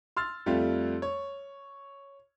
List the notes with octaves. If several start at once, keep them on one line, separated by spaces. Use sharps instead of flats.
C6 E6 F6 A6
F2 G3 A3 F4
C#5